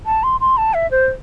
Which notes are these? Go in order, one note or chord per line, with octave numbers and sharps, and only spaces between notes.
A5
C6
C6
A5
E5
C5